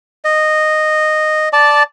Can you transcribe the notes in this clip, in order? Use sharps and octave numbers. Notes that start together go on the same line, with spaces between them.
D#5
D5 A5